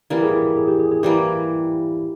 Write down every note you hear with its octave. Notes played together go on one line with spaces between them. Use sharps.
E3 G3 A#3 A#4
G#4
E4
G#4
G4
G#4
G#4
E3 G3 A#3 G4